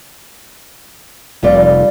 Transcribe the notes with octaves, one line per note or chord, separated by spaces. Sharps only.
F1 G3 F4 D5